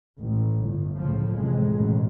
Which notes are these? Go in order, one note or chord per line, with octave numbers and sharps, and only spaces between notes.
A1
G1
C#2 A2 C#3 F3
A1 F2 C3 G#3
A1 F#2 B2